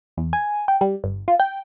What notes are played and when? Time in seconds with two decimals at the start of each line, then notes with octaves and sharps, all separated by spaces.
0.17 E2
0.33 G#5
0.68 G5
0.81 G3
1.04 G1
1.28 F4
1.40 G5